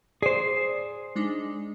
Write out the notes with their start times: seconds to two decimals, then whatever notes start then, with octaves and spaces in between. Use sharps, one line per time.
0.22 G#4 C5 D5
1.16 G#3 D4 D#4